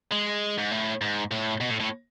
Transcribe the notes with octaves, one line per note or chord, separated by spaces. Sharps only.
G#3
G#2
A2
G#2
A2
B2
A2
A2